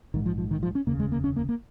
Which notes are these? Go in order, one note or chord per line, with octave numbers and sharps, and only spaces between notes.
A#1 G#2 D#3
F3
F3
D#3
F3
C#4
F1 D#2 C#3 A#3
G#3
A#3
C#4
A#3
A#3